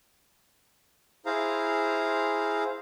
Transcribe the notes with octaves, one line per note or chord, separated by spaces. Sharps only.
E4 G#4 C5 F5 A#5